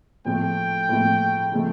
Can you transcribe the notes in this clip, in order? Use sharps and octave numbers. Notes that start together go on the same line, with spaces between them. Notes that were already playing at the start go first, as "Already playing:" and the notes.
A2 F3 A3 G5
A2 F3 A3
C#3 F3 A3